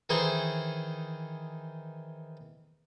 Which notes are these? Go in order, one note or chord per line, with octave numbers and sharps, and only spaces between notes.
D#3 E3 D#4 G#4 C5